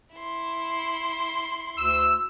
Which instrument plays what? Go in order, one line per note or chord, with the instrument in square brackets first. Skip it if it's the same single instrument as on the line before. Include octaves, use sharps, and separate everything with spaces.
[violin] E4 C6
[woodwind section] D2 E6